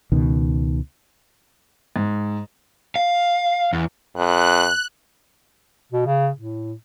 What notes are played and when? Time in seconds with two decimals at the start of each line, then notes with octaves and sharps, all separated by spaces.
0.12 C#2 B2 D#3
1.96 G#2
2.96 F5
3.73 E2
4.16 F2 F#6
5.92 B2
6.06 C#3
6.37 A2